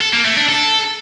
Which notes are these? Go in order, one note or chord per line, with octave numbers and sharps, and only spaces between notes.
A4
A#3
A3
D4
A4